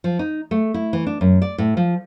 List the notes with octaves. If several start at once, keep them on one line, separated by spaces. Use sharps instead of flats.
F3
D#4
A3
E4
E3
D4
F#2
D5
A2
F3